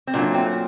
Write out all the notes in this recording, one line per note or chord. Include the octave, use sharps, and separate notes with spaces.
C4
A#2 F#3 A3 D4
C4